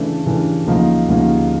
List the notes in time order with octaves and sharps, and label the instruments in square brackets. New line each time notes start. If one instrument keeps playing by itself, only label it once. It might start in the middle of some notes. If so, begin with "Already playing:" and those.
Already playing: [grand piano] C#3 E3 A3 D4
C#3 E3 A3 D4
D2 C#3 F3 A#3 D#4
D2 C#3 F3 A#3 D#4